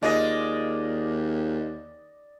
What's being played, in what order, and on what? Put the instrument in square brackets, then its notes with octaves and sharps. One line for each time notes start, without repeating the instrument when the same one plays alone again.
[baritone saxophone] D#2 [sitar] G#3 F4 [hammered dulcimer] D5 D#5